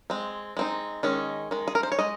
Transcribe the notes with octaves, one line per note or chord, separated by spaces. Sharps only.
G#3 C4
G#3 C4 D#4
D#3 G#3 C#4
D#3 G#3
G#4
A#4
C5
C#5
G#3 D#5